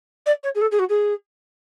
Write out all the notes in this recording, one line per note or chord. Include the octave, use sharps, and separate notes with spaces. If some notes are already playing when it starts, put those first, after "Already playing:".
D5
C#5
G#4
A4
G#4
F#4
G#4